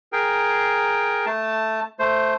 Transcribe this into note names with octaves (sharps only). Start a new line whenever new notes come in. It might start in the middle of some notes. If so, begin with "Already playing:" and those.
G#4 A#4 G5
A3 A5
A3 C5